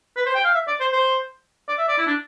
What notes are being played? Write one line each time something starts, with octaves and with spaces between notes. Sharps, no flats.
B4
C5
G5
F5
E5
D5
C5
C5
D5
E5
D5
E4
D4